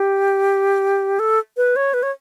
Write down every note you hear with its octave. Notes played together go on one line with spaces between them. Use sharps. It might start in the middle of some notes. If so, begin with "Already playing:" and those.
Already playing: G4
A4
B4
C#5
B4
C#5